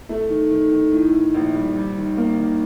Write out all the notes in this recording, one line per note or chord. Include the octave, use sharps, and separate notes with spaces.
A3
D#3
D#3
D#3
A2
A2
A#1
G3
G3
D#3
A#3
D#3